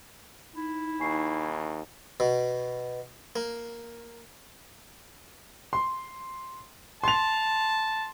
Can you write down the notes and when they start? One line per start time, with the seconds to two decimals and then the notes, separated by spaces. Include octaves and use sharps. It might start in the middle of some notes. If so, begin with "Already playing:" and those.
0.55 D#4 E4
1.00 D#2 G#5 C#6 C7
2.20 B2
3.36 A#3
5.73 C6
7.04 A5 C6 F7